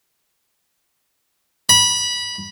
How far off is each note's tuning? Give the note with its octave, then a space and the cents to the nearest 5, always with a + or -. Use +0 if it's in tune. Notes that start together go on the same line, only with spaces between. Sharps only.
B5 -20